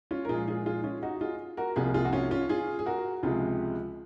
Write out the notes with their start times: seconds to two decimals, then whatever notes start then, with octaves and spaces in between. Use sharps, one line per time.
0.11 C#4 F4
0.25 A#4
0.29 A#2 F3 G#3 F4 G#4
0.47 F4 G#4
0.66 F4 G#4
0.84 C#4 F4
1.03 D#4 F#4
1.21 F4 G#4
1.57 F#4 A#4
1.76 C2 C3 F3 A#3 F4 G#4
1.94 F4 G#4
2.05 F#4
2.13 C#4 F4
2.31 C#4 F4
2.49 F4 G#4
2.79 G#4
2.86 F#4 A#4
3.23 C#2 C3 F3 G#3 F4 G#4